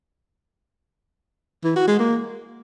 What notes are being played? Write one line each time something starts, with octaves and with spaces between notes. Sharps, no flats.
E3
F#4
G#3
A#3